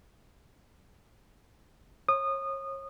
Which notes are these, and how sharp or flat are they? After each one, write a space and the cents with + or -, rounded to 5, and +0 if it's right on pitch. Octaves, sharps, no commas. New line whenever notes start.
C#5 -35 D#6 -20